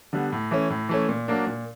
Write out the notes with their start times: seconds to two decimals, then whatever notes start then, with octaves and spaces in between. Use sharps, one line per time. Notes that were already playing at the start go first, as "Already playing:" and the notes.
0.13 D3 G3 B3
0.32 A2
0.51 E3 A3 C#4
0.70 A2
0.89 E3 A3 C#4
1.09 A#2
1.28 F#3 A#3 D4
1.47 A#2